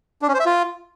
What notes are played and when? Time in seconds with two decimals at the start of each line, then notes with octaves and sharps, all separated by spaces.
0.22 D4
0.28 C#4
0.34 C5
0.40 E5
0.46 F4